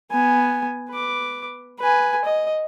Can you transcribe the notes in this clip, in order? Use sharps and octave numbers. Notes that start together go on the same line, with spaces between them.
B3 G#5
B4 D6
B4 G#5
D#5